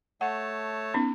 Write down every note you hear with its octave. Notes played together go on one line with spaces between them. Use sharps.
A3 C#5 F#5 A5
B3 C#4 D#4